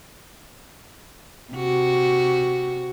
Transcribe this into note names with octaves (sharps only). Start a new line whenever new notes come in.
C3 F#4